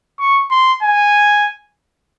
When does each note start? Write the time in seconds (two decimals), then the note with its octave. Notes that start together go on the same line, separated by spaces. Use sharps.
0.19 C#6
0.50 C6
0.83 G#5